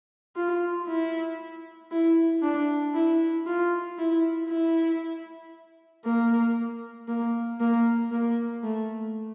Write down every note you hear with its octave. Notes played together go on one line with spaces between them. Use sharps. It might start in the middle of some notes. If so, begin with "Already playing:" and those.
F4
E4
E4
D4
E4
F4
E4
E4
A#3
A#3
A#3
A#3
A3